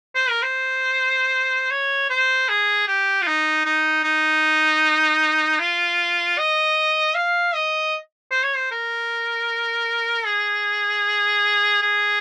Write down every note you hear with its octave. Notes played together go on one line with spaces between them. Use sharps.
C5
A#4
C5
C#5
C5
G#4
G4
F4
D#4
D#4
D#4
F4
D#5
F5
D#5
C5
C#5
C5
A#4
G#4
G#4